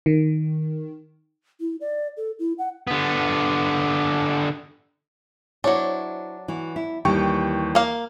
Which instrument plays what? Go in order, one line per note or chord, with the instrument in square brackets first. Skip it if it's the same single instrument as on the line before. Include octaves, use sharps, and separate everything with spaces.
[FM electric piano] D#3
[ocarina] E4
D5
A4
E4
F#5
[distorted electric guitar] D3 B3
[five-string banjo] F#3 D4 [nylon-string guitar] E4 C5 C#5
[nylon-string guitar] E3 F#4
E4
[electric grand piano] D#2 G5 C#6 [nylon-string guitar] E3 G3 D#4
[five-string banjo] A#3 F5